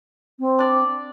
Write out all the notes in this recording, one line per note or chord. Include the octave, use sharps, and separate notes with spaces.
C4
D4 D5